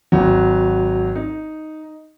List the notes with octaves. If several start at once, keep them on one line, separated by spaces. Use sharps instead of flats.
G#1 F#3
D#4